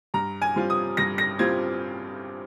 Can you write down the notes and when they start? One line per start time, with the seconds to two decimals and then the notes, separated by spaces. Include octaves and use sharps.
0.14 G2 A#5
0.42 G#5
0.56 G3 C4 F4
0.70 D#6
0.97 G2 A#6
1.18 A#6
1.39 G3 C4 F4 G#6